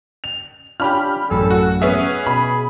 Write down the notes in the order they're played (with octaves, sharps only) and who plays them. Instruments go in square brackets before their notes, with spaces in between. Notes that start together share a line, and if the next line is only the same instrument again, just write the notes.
[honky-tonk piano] F7
[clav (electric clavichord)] C#4 D4 F4 [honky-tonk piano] G4 B5 F6
[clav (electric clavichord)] A1 F#2 G#5 [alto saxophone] A4
[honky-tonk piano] F#4
[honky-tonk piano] B3 C#4 E5 [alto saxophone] G#4
[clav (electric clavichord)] B2 [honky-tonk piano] B5